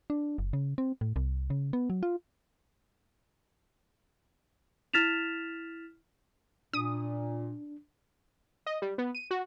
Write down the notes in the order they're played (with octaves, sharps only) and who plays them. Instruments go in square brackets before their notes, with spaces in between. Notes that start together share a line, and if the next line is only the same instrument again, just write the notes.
[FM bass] D4
F#1
C#3
C4
A2
C2
C#3
B3
F#3
F4
[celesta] E4 F6 A6 B6 E7 F7
[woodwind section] A#2 [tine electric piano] D4 [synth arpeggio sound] D#6
[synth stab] D#5
G3
B3
D#7
F#4